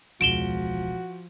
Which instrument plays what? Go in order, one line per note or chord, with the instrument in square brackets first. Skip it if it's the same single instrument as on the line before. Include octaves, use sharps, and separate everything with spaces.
[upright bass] E1 C#2 [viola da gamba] F3 [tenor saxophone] F#4 [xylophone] D7 E7 G7